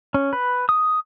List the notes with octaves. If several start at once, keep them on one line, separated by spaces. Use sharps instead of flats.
C#4
B4
D#6